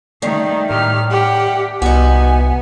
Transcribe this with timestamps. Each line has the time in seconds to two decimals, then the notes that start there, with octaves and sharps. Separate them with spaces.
0.22 D#3 G3 A3
0.70 A2 D#3 G4 F6
1.11 G4 F#5
1.82 C2 B3 D#4 F#4 G#5